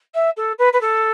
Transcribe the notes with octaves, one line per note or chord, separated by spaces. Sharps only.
E5
A4
B4
B4
A4